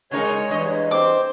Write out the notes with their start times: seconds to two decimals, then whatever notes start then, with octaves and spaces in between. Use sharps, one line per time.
0.11 C#3 G#3 D#4 A#4 C#5
0.49 E2 G2 D#5
0.91 C4 C5 D6